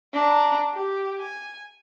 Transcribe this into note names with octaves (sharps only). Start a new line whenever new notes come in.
D4 A#5
G4
G#5